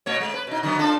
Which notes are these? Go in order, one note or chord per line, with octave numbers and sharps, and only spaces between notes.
B2 A3 C#5
G#3
B4
B2 D#4
D3 F#3 B3
D4 F4 A4